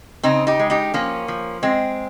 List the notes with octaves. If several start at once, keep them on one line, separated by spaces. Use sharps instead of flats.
C#3 C4 D#4
D#4 G4
G#3
D#4 G4
F3 A#3 C#4
F3
G#3 C4